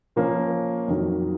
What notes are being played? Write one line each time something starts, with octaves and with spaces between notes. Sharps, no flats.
A#2 F3 A#3 C#4
F2 D#3 F#3